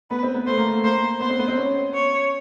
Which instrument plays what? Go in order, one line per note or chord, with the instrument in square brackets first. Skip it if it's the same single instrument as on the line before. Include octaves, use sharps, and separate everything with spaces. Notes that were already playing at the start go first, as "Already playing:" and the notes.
[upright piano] B3 [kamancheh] B4
[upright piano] C4
B3
[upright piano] A3 [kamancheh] C5
[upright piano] A#3
A3
[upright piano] A#3 [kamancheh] C5
[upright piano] B3 [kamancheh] C5
[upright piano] C4
B3
C4
C#4
[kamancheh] C#5